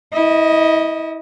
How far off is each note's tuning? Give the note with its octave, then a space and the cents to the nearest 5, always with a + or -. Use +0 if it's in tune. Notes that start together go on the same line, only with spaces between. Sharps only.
E4 -25 D#5 +0